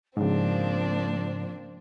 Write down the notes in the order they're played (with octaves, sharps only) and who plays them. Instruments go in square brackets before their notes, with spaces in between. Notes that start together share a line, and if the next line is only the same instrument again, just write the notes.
[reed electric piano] G#2 C#3 [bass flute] F3 [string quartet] A#3 C4 D4